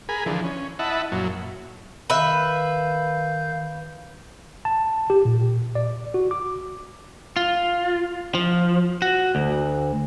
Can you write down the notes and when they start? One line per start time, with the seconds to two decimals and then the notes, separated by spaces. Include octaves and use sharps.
0.09 G#4 A#4 G#5 B5
0.26 D3 E3 F3
0.44 C#4
0.79 E4 D#5 E5 F#5 A5 B5
1.12 F#2 A#2 F#3
2.10 D#3 B4 E5 F5 G6
4.65 A5
5.10 G4
5.25 A#2
5.75 D5
6.14 F#4
6.31 D6
7.36 F4
8.35 F3
9.02 F#4
9.35 D2